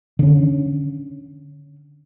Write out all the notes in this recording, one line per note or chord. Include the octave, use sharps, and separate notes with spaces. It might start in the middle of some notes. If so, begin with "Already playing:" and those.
D3 C#4